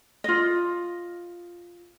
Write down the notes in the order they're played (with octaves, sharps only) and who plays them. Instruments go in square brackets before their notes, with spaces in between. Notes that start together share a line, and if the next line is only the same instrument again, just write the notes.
[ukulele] F4 D#5